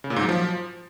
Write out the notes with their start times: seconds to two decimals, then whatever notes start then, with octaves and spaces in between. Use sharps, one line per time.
0.04 C#3
0.10 A#2
0.16 G#2
0.23 F#3
0.29 F3